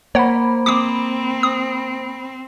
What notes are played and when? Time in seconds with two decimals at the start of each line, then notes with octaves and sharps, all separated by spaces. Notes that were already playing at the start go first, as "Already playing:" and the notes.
0.15 A#3 C5 C#5 F#5 B5
0.66 C4 D6 D#6
1.43 D#6